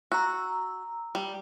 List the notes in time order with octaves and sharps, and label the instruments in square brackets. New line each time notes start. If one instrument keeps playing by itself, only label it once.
[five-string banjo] F#4 [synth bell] A#5 E6
[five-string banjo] G3